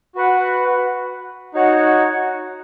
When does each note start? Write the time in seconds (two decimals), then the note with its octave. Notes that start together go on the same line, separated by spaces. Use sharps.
0.15 F#4 B4 F#5
1.54 D#4 F#4 C#5 F#5